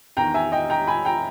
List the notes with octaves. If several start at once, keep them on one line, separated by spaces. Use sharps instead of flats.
E2 D#3 G5 A#5
E5 G#5
D#5 G5
G5 A#5
G#5 B5
G5 A#5